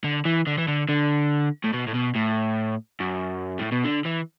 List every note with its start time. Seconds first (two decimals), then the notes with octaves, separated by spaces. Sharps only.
0.04 D3
0.25 E3
0.47 D3
0.58 E3
0.68 D3
0.89 D3
1.64 A2
1.73 B2
1.88 A2
1.95 B2
2.16 A2
3.00 F#2
3.59 A2
3.72 B2
3.85 D3
4.06 E3